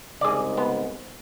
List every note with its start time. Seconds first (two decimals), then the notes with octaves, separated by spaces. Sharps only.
0.21 C2 G#2 C#3 G#4 D5
0.57 B3